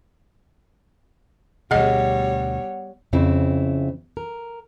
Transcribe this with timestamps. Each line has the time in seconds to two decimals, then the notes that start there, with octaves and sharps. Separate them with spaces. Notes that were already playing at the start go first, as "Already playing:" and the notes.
1.71 D2 B2 G3 B3 G#4 C#5 D#5 F#5
3.13 F2 C#3 C4 E4
4.17 A#4